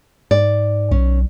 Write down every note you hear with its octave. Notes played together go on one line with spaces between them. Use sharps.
G#2 D5
B1 C#4